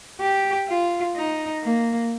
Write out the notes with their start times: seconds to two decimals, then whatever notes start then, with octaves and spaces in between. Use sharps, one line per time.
0.20 G4
0.69 F4
1.16 D#4
1.63 A#3